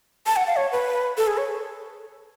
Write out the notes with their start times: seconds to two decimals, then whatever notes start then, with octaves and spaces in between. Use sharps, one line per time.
0.26 A5
0.36 F#5
0.47 F5
0.56 C#5
0.72 B4
1.17 A4
1.27 G#4
1.37 C#5